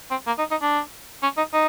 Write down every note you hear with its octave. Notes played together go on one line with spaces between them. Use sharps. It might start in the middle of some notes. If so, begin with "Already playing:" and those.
C4
A#3
D#4
D#4
D4
C#4
D#4
D#4